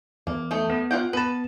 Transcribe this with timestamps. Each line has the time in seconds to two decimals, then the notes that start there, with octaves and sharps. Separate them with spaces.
0.27 E2 A#3
0.51 A3 D#4
0.70 B3
0.91 F4 F#5 G5
1.13 B3 B4 A5